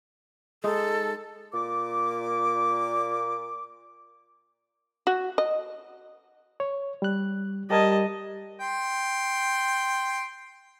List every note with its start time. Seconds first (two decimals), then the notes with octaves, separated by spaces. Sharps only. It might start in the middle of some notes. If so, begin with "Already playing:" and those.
0.64 G#3 D#4 A4
1.53 A#2 D6
5.07 F#4
5.38 D#5
6.60 C#5
7.02 G3 F#6
7.70 G3 G4 A#4 D#5 A5 G#6
8.60 G5 C6